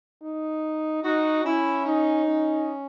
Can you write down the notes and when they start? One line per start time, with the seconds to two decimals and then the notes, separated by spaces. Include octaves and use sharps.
0.23 D#4
1.04 D#4 F#4
1.45 C#4 E4
1.85 D#4
2.26 C#4